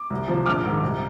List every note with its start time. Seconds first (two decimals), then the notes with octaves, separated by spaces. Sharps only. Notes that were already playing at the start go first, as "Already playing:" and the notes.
Already playing: D6
0.10 C2
0.28 C3 F3
0.46 A#1 D6 F6
0.64 G#2 D#3
0.82 C2